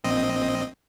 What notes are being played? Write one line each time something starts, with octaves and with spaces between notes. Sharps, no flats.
A#1 C4 D#5